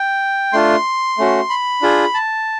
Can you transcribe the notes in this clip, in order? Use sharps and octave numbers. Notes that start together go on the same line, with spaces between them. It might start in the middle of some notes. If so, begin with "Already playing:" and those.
Already playing: G5
A3 D4 F4 C6
A3 C#4 F#4
B5
D4 F4 G#4
A5